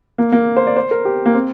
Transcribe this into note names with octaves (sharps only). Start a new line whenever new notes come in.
A#3
A#3
C5
D5
C5
A#4
G4
A#3
C4